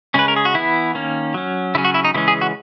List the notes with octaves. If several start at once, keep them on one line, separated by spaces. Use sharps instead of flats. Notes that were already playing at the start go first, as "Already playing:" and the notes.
C#3 G#3 C#4 B4
A#4
G#4
F#4
E3 B3 E4
D#3 A#3 C#4
F#3 C#4
C#3 F#3 C#4 E4
F#4
E4
D#4
C#3 E3 G#3 C#4 E4
G#4
F#4